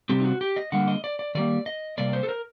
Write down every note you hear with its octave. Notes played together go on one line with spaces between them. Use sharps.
C3 G3 C4 G4
D#4
F#4
G4
D#5
D3 G3 A#3 F#5
D#5
D5
D5
D#3 G3 A#3 D5
D#5
C3 G3 A#3 D5
C5
A4
A#4